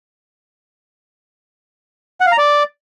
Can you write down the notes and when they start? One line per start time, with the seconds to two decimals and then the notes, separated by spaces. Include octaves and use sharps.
2.21 F#5
2.26 F5
2.32 A#5
2.38 D5